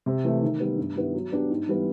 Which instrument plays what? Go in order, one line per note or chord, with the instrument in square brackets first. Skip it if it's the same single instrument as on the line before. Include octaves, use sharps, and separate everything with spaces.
[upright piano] C3
E3 A3
D#3
G3 B3
G2
D#3 G3 B3 E4
F#3
B3 D4 G4
G#2
E3 G3 B3